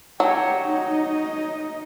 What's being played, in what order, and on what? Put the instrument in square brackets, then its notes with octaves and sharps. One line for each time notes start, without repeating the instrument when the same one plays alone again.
[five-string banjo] F#3 [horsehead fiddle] G4 C#5
[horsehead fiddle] D#4 D#5